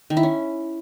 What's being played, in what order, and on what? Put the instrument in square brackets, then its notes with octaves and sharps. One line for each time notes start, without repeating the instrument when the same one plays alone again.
[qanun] D#3
E4
C#4